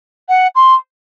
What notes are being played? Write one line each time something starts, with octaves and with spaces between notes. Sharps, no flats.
F#5
C6